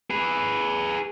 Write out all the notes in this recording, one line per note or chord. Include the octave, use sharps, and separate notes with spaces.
G#4 B4